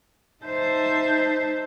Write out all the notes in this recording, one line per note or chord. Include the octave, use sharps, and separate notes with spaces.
D#4 C5 E5 A5 G6